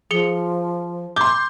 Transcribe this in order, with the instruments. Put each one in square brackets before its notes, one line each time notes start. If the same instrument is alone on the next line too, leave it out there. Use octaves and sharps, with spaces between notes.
[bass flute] F3 [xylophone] G#4 C#7 G7
[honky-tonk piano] C6 G6 [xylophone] D6